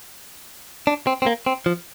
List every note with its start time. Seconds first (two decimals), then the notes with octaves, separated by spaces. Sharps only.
0.87 D4
1.07 C4
1.22 C4
1.26 A#3
1.46 C4
1.66 F3